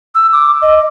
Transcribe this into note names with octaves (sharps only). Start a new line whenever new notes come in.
E6
D6
D#5